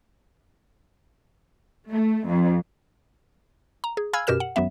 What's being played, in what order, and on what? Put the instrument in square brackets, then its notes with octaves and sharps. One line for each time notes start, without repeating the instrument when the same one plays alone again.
[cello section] A3
F2
[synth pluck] A#5
G#4
F5 G#5 B5 E6 F6 G#6
F#2 B2 G4 A#4 F6 E7
F#5
G#1 F#2 F#3 B3 E5